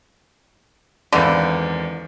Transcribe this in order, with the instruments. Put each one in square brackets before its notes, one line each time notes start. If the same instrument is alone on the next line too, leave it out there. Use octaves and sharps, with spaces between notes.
[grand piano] G#1 E2 D5 [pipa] D3 E3